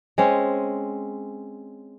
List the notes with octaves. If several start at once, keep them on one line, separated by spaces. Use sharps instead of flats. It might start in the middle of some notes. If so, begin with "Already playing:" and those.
G#3 C4 C#4